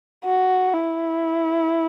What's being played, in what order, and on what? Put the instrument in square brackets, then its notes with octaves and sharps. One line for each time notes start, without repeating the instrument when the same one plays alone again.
[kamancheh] F#4
E4